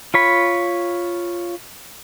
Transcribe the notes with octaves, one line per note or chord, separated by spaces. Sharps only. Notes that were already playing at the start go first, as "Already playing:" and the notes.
F4 C#5 B5